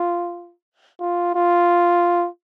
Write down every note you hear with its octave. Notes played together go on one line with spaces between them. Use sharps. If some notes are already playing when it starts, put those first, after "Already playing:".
Already playing: F4
F4
F4